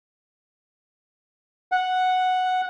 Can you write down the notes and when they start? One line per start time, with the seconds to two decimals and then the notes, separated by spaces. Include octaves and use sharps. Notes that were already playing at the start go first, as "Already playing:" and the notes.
1.72 F#5